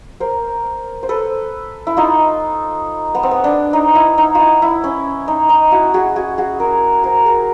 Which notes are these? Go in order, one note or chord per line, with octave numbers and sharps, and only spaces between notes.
A#4 C5
C5
A4 B4
E4
D#4 F4
B3
C4
B3
D4
D#4
E4
D#4
E4 F4
E4
C#4
D#4
D#4
E4 F#4
F#4 G#4
F#4 G#4
F#4 G#4
G#4 A#4
A#4 C5
G#4 A#4